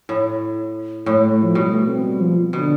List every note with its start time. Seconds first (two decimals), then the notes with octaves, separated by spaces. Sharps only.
0.09 A2
1.06 A2 A3
1.19 A3
1.31 A3
1.43 F3
1.55 B2 G3
1.71 A3
1.88 C4
2.04 G3
2.20 F3
2.52 B2 D3